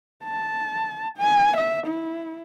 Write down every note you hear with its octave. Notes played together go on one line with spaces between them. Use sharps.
A5
G#5
E5
E4